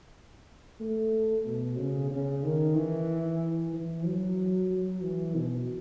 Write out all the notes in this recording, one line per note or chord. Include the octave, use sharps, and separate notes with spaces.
A3
B2
C#3
C#3
D#3
E3
E3
F#3
F#3
E3
B2